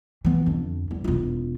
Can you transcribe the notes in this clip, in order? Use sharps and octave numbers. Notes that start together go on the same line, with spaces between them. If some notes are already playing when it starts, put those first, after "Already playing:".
E3 B3
F2 D3
E2
E1 F4